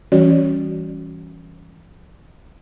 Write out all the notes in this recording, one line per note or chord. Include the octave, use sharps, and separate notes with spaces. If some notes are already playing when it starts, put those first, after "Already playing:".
E3 G3 C#4 F#4 C#5 D5